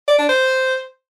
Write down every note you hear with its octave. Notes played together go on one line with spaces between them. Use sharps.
D5
D4
C5